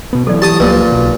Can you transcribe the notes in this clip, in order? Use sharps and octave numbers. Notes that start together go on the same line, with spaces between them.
B2 B3
E3 F#3 A4 D5
G4 A5 D#6
C#2 A#2 F3 F#3 B4
B1 B2